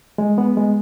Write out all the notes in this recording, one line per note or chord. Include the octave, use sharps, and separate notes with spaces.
G#3
B3
G#3